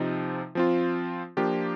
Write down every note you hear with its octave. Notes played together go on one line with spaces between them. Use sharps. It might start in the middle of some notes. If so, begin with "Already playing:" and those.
Already playing: C3 F3 C4 D#4
F3 C4 F4
F3 A#3 D4 F4 G4